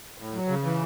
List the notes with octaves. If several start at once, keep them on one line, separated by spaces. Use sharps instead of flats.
A2
F#3
C#3
E3